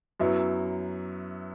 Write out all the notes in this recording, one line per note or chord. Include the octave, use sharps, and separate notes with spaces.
F#2 F#3 B3 E4